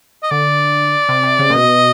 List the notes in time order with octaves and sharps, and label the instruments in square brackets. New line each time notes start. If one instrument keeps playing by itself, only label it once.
[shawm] D#5
[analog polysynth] D3 [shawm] D5
[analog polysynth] C3
C3
C#3
A#2
[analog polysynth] B2 [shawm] D#5